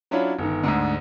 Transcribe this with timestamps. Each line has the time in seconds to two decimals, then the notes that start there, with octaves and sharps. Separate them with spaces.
0.11 F#3 C#4 D4 E4 F4
0.39 G1 D#3
0.63 D2 G#2 D3